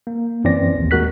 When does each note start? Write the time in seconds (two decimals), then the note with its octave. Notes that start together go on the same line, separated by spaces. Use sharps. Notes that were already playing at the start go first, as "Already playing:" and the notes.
0.07 A#3
0.44 F#2 E3 C4 C#4 D5 A#6
0.75 A#1 D#2
0.91 D#2 G#3 F#4 A#4 F#6 B6